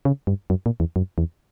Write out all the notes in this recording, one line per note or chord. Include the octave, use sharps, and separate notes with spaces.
C#3
G2
F#2
A#2
E2
F#2
E2